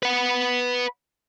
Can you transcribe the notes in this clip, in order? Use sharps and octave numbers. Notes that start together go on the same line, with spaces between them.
B4 F#5